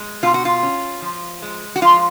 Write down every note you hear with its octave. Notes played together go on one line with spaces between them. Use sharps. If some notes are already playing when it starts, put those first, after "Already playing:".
Already playing: G#3
B2 F4
F#4
F4
C#4
F3
G#3
F#4
F3 F4